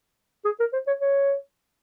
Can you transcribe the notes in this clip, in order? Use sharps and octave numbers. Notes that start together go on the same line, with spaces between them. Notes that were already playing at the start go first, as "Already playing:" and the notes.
G#4
A#4
C5
C#5
C#5